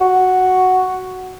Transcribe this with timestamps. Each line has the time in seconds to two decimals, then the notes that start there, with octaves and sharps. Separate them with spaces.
0.01 F#4